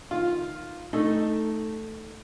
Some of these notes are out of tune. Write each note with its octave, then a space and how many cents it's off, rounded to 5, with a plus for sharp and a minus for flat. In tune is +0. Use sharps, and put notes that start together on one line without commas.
D#3 +0 F4 +0
A3 +0 D#4 +0 A4 +0